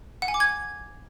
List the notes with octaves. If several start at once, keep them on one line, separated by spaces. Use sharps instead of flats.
F#5
G#5
D6
G#6